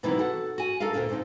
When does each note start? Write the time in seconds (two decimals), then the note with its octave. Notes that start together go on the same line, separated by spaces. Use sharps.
0.03 B2 D#3 E3 F#3 A#3 C4
0.18 F#4 A4 F#5
0.58 F#4 G#5
0.80 D4 A4 A#4 D#5 F5
0.93 D2 G2 A#2 A#3 C#4
1.09 D2 A#2 D3 C4 D#4